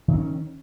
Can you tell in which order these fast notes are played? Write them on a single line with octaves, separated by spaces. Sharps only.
D#3 C4 C#4